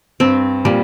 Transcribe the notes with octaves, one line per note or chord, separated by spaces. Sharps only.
G2 C4
A#2 G3